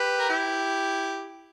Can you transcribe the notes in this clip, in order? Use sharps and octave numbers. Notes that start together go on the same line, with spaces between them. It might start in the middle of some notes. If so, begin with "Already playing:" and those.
Already playing: G4 B4
A#4
E4 G4